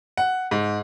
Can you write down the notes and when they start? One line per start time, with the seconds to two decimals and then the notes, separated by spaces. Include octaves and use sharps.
0.17 F#5
0.51 G#2